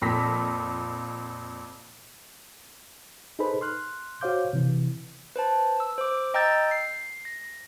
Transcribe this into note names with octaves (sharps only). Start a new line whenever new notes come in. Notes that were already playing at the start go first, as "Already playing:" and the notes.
F2 A#2 A#6 B6
D#4 G#4 A4 B4 C5 B5
C6 F6 F#6
F#4 C5 C#5 F5 D6 G6
C3 E3
B4 C5 A5
E6
C5 D6
D#5 G5 A#5 E6 G6 A6
C7
A#6